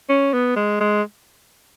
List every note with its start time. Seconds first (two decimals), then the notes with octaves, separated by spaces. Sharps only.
0.09 C#4
0.33 B3
0.56 G#3
0.81 G#3